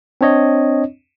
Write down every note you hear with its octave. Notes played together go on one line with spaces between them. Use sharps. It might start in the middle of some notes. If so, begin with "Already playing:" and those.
C4 D4 C#5 D#5